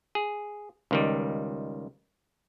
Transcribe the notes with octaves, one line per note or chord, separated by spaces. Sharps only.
G#4
C#2 D#3 G3